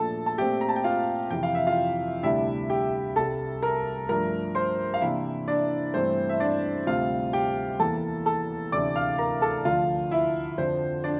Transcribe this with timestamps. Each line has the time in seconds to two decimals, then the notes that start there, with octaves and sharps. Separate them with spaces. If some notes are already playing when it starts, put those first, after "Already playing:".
Already playing: A#2 F3 A3 D4 A4 A5
0.26 A5
0.38 A#2 A3 C4 G4 G5
0.61 A#5
0.69 A5
0.76 G5
0.84 F4 F5
1.30 F2 C3 E3 G5
1.43 F5
1.55 E5
1.67 F4 F5
2.23 D2 C3 G3 D4 E4 E5
2.70 G4 G5
3.16 C2 C3 G3 A4 A5
3.62 A#4 A#5
4.09 G2 F3 A3 D4 A#4 A#5
4.55 C5 C6
4.94 F5
5.01 C3 E3 A#3 D4 E4 E5
5.48 D4 D5
5.94 G2 E3 A3 C4 C5
6.29 E5
6.40 D4 D5
6.87 D2 C3 G3 C4 F4 F5
7.33 G4 G5
7.79 E2 E3 A#3 A4 A5
8.26 A4 A5
8.72 D2 C3 E3 A3 D4 D5 D6
8.96 F5 F6
9.18 A#4 A#5
9.42 A4 A5
9.65 D2 D3 F3 F4 F5
10.11 E4 E5
10.58 F2 D3 F3 C5
11.04 D4 D5